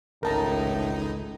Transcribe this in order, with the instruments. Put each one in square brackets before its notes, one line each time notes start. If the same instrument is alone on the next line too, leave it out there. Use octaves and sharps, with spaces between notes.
[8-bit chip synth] G#1 D#4 [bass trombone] C#2 [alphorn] A2 [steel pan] A#4 A5 A#5